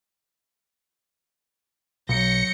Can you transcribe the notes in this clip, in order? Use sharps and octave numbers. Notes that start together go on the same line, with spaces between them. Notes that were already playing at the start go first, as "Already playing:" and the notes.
B1 F#3 G6 A#6 C#7